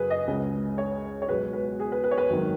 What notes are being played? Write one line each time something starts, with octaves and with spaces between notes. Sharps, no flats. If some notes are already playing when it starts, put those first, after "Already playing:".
Already playing: F#1 F#2 F#3 G#4 B4
D#5
C#2 C#3 G#3
C#5
C#5
B1 B2 G#3 B4
B4
G#4
B4
B4
C#5
B4
G#1 F#2 D#3 F#3